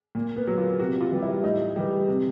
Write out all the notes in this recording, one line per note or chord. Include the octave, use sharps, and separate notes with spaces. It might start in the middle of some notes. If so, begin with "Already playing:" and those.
A#2 A#3
B3
F#3
F4
C3 F#4
F4
E3 G3
E4
A2 D#4
E3 G3
C3